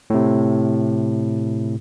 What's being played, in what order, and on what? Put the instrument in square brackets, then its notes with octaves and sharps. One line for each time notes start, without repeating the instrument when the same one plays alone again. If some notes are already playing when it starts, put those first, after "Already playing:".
[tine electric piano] A2 C3